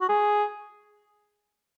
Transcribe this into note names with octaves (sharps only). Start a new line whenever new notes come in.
F#4
G#4